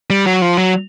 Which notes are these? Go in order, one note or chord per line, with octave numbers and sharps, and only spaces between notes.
G3
F#3
F3
F#3